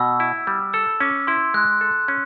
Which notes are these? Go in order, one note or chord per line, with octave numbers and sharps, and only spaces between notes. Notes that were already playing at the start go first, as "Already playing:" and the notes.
Already playing: B2 E6
E4
G3
A4 E6
C#4 D6
E4 C6
G#3 F#6
A4
C#4